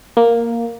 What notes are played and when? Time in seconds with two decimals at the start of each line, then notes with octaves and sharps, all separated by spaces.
0.17 A#3